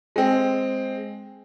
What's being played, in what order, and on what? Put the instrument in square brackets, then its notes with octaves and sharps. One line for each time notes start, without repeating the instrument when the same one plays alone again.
[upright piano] G#3 C4